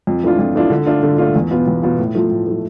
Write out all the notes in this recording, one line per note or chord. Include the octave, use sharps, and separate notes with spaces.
F2
E3 A3 D4 F4
F2
E3 A3 D4 F4
D3
A3 D4 F4
D3
A3 D4 F4
E2
B2 B3 F4
E2
B2 B3 F4
A2
F3 A3
A2
F3 A3